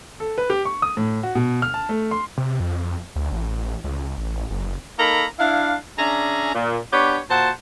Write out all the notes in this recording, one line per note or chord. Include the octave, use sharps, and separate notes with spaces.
A4
B4
G4
C#6
D#6
A2
F#4
B2
F6
A5
A3
C6
C3
F2
D2
A1
C#2
A1
F#1
A#3 D#4 A4 A#4 A#5 B5
D4 E4 F5
C#4 D4 G#4 E5 A#5
A#2
B3 D4 G4 C#5
A#2 F#4 C5 F#5 A5